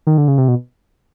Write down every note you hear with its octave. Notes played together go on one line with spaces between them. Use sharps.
D#3
D3
C#3
C3
B2